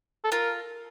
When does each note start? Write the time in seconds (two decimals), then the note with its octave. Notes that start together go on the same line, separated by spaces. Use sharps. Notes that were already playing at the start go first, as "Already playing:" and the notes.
0.24 A4
0.32 F4 A#4